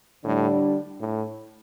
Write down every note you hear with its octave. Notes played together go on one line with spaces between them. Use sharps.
A2 D3 G3 D4
A2